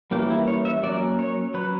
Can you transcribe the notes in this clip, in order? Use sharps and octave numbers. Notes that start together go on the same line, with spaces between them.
E3 G3 A#3 C#4 G4
E4
C#5
E5
F#3 A#3 C#4 D5
C#5
F#3 C#4 B4